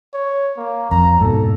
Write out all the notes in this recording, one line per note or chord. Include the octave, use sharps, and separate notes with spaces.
C#5
A#3
F2 A#5
G#2 B2 A4